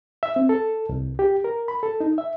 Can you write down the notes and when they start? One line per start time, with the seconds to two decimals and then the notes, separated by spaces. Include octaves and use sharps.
0.23 E5
0.36 C4
0.49 A4
0.89 C2
1.19 G4
1.44 A#4
1.68 B5
1.83 A4
2.01 D#4
2.18 E5